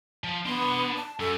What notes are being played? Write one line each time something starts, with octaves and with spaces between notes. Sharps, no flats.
F3
B3 D4 C6
A5
F#2 A4